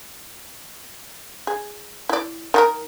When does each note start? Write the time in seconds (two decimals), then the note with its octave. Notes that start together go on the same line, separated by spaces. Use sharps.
1.47 G#4
2.09 E4 D5
2.54 D#3 F#4 A#4